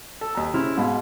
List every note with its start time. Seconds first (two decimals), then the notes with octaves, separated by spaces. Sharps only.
0.21 A4
0.35 D#2 A#5
0.54 C#3 C4 E4 F6
0.77 G#2 B2 F5 B5